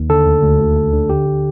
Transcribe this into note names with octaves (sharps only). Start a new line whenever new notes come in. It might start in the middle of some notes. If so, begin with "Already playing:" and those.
Already playing: D#2
D3 A4
D2
D2
D2
D2
D3
D3 G4
D3